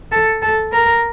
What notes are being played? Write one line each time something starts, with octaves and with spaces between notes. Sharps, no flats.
A4
A4
A#4